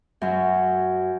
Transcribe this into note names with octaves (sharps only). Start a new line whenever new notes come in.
F#2 F#3